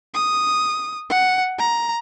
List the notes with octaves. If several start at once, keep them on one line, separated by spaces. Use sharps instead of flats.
D#6
F#5
A#5